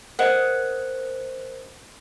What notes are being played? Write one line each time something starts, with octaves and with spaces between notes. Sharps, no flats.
A#4 C5 D#5 F#5